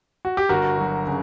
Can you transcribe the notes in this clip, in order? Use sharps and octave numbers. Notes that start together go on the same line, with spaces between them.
F#4
G4
G1 F#4 A#4
F#3
C#3